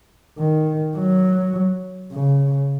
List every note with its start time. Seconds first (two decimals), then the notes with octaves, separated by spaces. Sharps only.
0.39 D#3
0.97 F#3
2.13 C#3